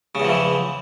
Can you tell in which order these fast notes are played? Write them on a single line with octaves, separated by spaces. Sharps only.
C#3 E2 F3 E3